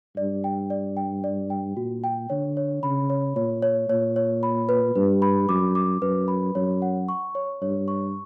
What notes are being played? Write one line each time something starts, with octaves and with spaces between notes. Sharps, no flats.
G2 D5
G5
D5
G5
D5
G5
A#2 F#4
G5
D3 C#5
C#5
C#3 B5
C#5
A#2 C#5
C#5
A#2 C#5
C#5
B5
B4
G2 B4
B5
F#2 D6
D6
F#2 B4
B5
F#2 C#5
F#5
C#6
C#5
G2 C#5
C#6